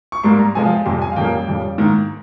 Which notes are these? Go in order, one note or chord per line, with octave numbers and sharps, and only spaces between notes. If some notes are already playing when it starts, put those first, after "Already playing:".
C#6
G#2 G3 A#3 C6
A#5
C3 F3 G#3 G#5
F5
G5
F2 C3 G3 C6
G#5
F5
F2 C#3 G3 A#3 G5
F2 C#3 G3
G#2 D#3 A#3